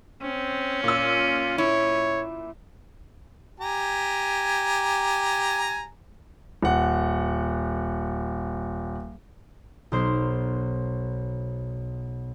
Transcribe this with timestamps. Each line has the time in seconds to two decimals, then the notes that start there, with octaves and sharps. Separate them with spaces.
0.22 C4 C#4
0.84 A#2 F4 E6
1.58 E4 C#5
3.60 G4 G#5 A#5
6.63 D#1 F#5
9.92 B1 A#4 C5